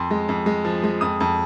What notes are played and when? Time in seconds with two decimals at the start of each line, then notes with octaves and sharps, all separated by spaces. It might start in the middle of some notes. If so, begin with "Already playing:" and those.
Already playing: F2 C6
0.11 G#3
0.29 F2
0.46 G#3
0.65 F3
0.84 G#3
1.01 F2 D#6
1.20 F2